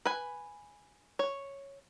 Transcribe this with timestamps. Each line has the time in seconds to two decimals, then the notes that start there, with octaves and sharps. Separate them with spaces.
0.06 B4 G#5
1.19 C#5